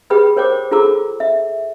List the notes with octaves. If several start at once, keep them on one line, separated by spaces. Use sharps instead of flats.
G4 G#4 B4 G5 B5 D#6
A#4 C5 C#5 G5 D6
F4 G#4 A4 A#5 D6 E6
E5